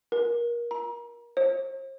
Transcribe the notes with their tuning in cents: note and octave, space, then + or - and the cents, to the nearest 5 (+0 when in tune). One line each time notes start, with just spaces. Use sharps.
A#4 +25
A#5 +35
C5 +45